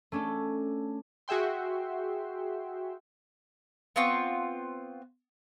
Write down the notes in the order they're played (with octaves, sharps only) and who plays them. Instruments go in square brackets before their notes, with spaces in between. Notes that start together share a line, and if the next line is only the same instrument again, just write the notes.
[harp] A3 C#4 D4 A4
[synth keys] F#4 G#4 E5 G5 C6
[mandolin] B3 C4 F4 C#6